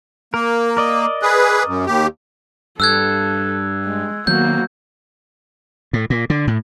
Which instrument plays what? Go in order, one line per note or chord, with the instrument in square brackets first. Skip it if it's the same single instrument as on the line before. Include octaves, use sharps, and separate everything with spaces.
[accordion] A#3 [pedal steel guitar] A#4
[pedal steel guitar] A#4 D5 D#5
[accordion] G#4 B4
F#2
D#2 G4
[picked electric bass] G2 [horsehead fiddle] A4 [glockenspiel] E6 F#6 G#6
[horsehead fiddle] G#3
[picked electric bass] D#3 F#3 B3 [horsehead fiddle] A#3 F#4 [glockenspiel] G6
[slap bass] A2
A#2
D3
A2